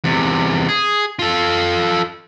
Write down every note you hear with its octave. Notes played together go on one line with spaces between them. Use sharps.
E2 C3
G#4
F4 A4